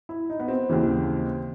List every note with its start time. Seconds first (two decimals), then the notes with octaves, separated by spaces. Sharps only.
0.09 E4
0.30 D#4
0.40 B3
0.48 C4
0.69 D#2 C#3 E3